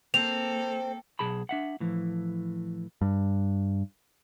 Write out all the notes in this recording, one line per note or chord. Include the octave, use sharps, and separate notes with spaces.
A#3 C4 A4 F7
B1 G#4 A5 B5
D4 E5 F#5
A2 E3 F3
G2